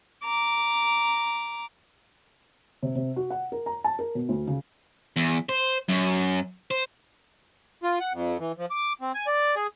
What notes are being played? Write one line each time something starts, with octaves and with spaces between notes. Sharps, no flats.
A#5 D6
C3
C3
F#4
F#5
A#4
A#5
A5
A#4
B2
D2
C#3
E2
C5
F#2
C5
F4
F#5
F2
E3
F3
D6
C4
G#5
D5
G#4